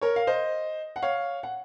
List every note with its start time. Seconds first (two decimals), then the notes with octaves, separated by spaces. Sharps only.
0.01 A#4 C#5
0.16 F5
0.27 C5 D#5
0.96 F#5
1.02 C#5 F5
1.43 F#5